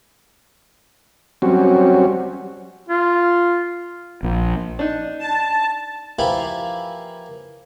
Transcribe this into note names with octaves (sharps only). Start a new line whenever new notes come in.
F#3 G3 C4 C#4 F#4
F4
A#1
D4 D#4
A5
E3 F3 A#3 E4 G4 B5